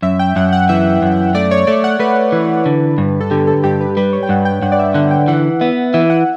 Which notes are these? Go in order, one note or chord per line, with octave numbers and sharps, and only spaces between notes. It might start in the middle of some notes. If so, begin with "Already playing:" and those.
F#2 E5
G5
F#2 F#5
F#5
E3 E5
F#2
A3 D5
C#5
A3 D5
F#5
A3 B4
E3
D3
G2
A4
D3 G4
A4
G2 G4
B4
G3 B4
C#5
G5
G2 F#5
G5
G2 F#5
D5
E5
D3 F#5
G5
E3 F#5
B3 E5
E3 E5
F#5